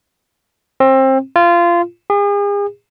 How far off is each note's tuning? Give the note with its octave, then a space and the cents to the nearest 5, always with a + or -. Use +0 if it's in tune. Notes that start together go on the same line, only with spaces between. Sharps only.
C4 +25
F4 -20
G#4 -40